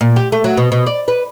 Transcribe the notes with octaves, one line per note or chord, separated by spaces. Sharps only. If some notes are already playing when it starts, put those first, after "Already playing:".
A#2
G4
A3
F#3
B2
B2
D5
B4